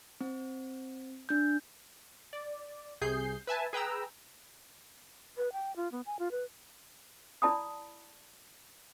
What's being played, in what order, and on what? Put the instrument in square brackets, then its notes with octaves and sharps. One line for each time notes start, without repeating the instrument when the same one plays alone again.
[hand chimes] C4
D4 G6
[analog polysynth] D5
C2 C3 G#4 G6 C7
B4 E5 G#5 A5
G#4 B4 G5 A#5 E6
[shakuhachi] B4
G5
F4
B3
G#5
F4
B4
[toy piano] E4 D5 A5 B5 D#6